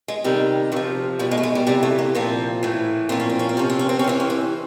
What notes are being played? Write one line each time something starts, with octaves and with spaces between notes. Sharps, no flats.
G#3
C3 D#3 G3
C3 F3 F#3
B2 G3
G#3
A3
G#3
G3
C3 E3 G3
A3
A#3
A#2 F3 C4
A2 E3
A#2 F3 C4
C#4
C4
C#4
C4
C3 F3 C#4
C4
C#4
C4
C#4
C3 E3 C4
C#4
C4